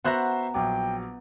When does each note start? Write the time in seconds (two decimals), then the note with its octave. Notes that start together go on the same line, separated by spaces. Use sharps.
0.04 B3 F#4 C5 E5 F#5 A#5
0.54 A#1 F#3 G5 D6